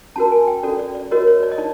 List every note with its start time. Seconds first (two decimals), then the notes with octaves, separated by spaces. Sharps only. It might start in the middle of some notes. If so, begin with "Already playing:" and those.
0.16 C#4 F#4 A#4 A5
0.31 G#5
0.47 G5
0.63 C#4 F#4 A4 D5
0.79 D5
0.95 D5
1.11 F#4 A#4 C#5 D#5
1.27 C#5
1.43 D5
1.52 D#5
1.58 D#4 D5